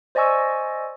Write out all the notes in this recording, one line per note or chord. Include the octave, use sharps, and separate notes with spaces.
C5 D5 D#5 G#5 C#6 E6